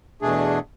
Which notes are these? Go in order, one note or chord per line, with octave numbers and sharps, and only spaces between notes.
E2 B2 A3 D4 G#4